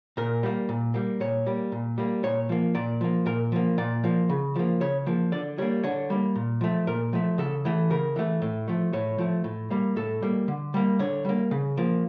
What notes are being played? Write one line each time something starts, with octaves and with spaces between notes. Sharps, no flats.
A#2 A#4
G3 A#3
A#2
G3 A#3
A#2 C#5
G3 A#3
A#2
G3 A#3
A#2 C#5
F3 A#3
A#2 D5
F3 A#3
A#2 A#4
F3 A#3
A#2 D5
F3 A#3
C#3
F3 A#3
C#3 C#5
F3 A#3
D3 D5
G3 A#3 C#5
D3 C#5
G3 A#3
A#2
F3 A3
A#2 A#4
F3 A3
C#3 A4
E3 A3
C#3 A#4
E3 A3
A2
F3 A3
A2 C#5
F3 A3
A2
G3 A#3
A2 A4
G3 A#3
D3
G3 A#3
D3 C#5
G3 A#3
C#3
F3 A#3